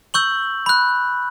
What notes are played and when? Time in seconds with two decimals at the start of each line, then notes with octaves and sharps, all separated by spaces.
0.14 C#6 E6 G6 F#7
0.66 B5 F#6